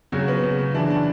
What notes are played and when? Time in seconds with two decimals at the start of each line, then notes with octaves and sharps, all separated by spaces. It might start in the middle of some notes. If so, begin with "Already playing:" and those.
0.12 C#3 F#3 F#4
0.28 B3
0.43 C#3
0.58 C#3
0.74 E3 D4 E4
0.90 D4